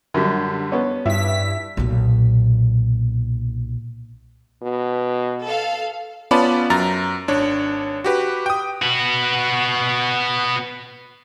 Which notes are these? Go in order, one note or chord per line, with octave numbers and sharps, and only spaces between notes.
F#2 D3 G3
B3 C#4
G2 E4 B6
B1 A#2
B2
A4 F5
B3 C#4 F4 D5 A5 B5
F#2 A#5 A6
G#1 D4 C#5
F#4 G4 B4
G5 D#6
B3 F#4